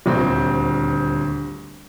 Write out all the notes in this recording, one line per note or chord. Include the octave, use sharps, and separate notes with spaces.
D#1 D2 D3 C4